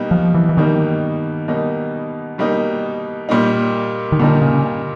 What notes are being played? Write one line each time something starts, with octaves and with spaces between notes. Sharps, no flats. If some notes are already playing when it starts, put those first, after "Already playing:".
Already playing: B2 G3 A#3 D#4
F3
E3
E3
B2 D#3 G3 A#3 D#4
B2 G3 A#3 D#4
B2 G3 A#3 D#4
A#2 G3 A#3 D#4
D#3
A#2 D3 G3 A#3 D#4
C#3